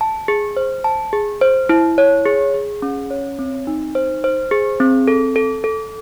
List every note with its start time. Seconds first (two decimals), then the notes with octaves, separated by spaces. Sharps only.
0.01 A5
0.28 G#4
0.57 C5
0.84 A5
1.13 G#4
1.41 C5
1.69 E4
1.98 C#5
2.26 G#4
2.54 G#4
2.82 C#4
3.10 C#5
3.39 C4
3.67 D#4
3.95 C5
4.24 C5
4.51 G#4
4.80 C4
5.08 A4
5.36 A4
5.64 A4